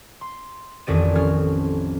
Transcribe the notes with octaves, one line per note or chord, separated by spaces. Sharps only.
C6
A1 F2 D#3 D5 D#7
F3 C#4 F6